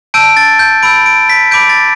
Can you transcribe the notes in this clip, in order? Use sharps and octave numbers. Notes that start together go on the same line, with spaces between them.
A5 E6 G6 D7
A6
G6
B5 E6 G6 D7
D7
B6
B5 D6 G6 D7
A6